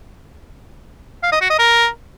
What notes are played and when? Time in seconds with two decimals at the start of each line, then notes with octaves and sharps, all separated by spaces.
1.23 F5
1.32 D#5
1.41 F#4
1.50 D#5
1.59 A#4